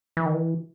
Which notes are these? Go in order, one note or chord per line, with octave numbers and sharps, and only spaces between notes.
E3
D#3
E3